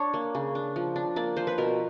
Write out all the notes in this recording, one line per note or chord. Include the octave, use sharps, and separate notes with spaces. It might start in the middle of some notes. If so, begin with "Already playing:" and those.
Already playing: D4 C#5
A#3
C#3
D4
F3
D4
A#3 D5
F3 C5
B4
B2 A#4